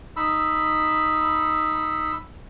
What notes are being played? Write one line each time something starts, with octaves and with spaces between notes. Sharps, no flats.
D#4 B5 E6